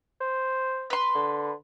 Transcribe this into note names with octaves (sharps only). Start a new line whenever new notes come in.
C5
B4 C6
D3